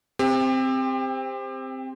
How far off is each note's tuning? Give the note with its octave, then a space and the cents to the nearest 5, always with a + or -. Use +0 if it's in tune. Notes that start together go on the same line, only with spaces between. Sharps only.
C4 +0 G4 +30